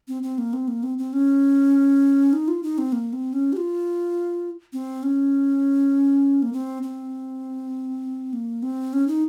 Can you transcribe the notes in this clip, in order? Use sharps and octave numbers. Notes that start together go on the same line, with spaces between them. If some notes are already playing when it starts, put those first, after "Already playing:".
C4
C4
A#3
C4
A#3
C4
C4
C#4
D#4
F4
D#4
C4
A#3
C4
C#4
G4
F4
C4
C#4
A#3
C4
C4
A#3
C4
C#4
D#4